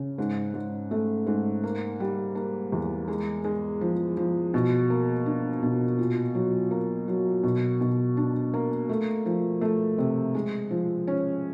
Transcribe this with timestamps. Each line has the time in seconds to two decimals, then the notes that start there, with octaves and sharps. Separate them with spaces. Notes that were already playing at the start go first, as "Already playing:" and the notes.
Already playing: C#3
0.18 G#2
0.54 G#2
0.91 A3
1.27 G#2
1.64 A#3
2.00 G3
2.35 A#3
2.72 E2
3.08 G#3
3.45 G#3
3.81 F3
4.17 F3
4.54 B2
4.90 A#3
5.26 D4
5.62 B2
5.99 A#2
6.35 F#3
6.71 A#3
7.08 F#3
7.43 B2
7.81 B2
8.17 D4
8.54 A#3
8.89 A3
9.26 F3
9.61 A3
9.98 C3
10.35 G#3
10.71 F3
11.07 C#4